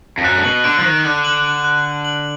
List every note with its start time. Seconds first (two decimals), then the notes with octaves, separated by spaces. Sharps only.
0.18 F2
0.24 F#2 F#6
0.38 D3
0.44 B2 F#7
0.64 D3 D7
0.79 F3
0.84 D#3 F#6
1.04 D3 F#6
1.25 F#7
1.44 D7
1.64 F#6
1.85 F#6
2.05 F#7